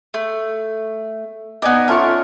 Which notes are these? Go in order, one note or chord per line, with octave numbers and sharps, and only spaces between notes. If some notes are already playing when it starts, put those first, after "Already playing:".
A3
B3 D#4 D5 G#5
A3 C#4 F4 A#4 C#6